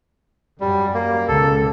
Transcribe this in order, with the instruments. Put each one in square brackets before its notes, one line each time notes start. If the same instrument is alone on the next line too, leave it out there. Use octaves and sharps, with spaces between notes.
[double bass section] F#2 [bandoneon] G3
[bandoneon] A#3
[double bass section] C#2 B2 [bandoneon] A4